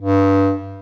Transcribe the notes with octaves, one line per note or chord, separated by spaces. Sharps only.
G2